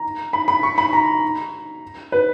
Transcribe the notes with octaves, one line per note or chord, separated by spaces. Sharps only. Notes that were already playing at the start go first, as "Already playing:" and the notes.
Already playing: A#5
B5
B5
C#6
B5
A#5
B4